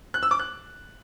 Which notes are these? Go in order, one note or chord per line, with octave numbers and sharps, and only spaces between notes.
F#6
E6
D6
F#6